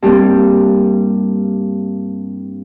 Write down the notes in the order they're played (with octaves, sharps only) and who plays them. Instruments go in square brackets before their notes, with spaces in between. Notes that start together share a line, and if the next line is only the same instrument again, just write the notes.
[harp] G2 G3 A#3 C4